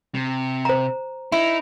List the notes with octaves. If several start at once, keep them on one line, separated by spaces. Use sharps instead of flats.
C3
C5 A#5
D#4 E4